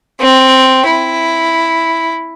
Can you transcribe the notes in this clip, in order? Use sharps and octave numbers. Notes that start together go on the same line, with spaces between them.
C4
E4